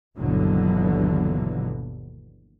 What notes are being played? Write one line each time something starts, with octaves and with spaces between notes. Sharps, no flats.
G1 D#2 B2 D3 E3 F#3